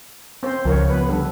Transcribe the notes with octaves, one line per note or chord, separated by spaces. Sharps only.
C4 C5
C#2 F3 A#4 C#5
F3 B3 B4
D3 G3 A4